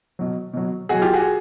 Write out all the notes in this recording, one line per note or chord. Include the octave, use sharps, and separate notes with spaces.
B2 F#3
B2 F#3
B2 F#3 F#4 G#4
F4 G4
F#4 G#4